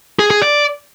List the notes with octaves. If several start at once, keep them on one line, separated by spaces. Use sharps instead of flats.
G#4
G#4
D5